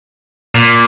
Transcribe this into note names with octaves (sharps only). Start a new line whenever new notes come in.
A#2